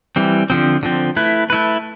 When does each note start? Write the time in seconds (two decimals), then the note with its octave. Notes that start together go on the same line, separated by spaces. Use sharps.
0.16 E3 G3 C4
0.50 D3 F3 C4
0.83 D3 F3 C4
1.17 A3 E4 B4
1.50 A3 E4 B4